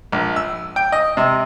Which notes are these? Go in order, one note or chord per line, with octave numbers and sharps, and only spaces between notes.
A#1
E6
G5
D#5
C3